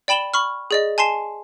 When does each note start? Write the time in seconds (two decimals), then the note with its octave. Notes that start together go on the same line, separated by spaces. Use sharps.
0.08 D5 G5 B5 E7 F#7 G7
0.34 B5 C#6 F6
0.71 G#4 D5 D#5
0.98 G#5 A5 C6 C7 E7